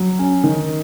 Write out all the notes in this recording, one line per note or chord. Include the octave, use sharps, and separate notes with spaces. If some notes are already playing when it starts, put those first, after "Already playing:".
Already playing: F#3
C#4
D#3